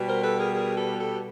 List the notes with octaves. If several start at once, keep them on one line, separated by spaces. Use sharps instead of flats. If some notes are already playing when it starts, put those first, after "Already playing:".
Already playing: B2 G3 B3
A#4 C5
A4 B4
G#4 A#4
G#4 A#4
G4 A4
G4 A4